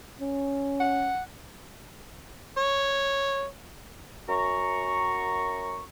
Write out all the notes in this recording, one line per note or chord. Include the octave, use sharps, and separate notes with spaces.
C#4
F#5
C#5
F#2 A#5 C#6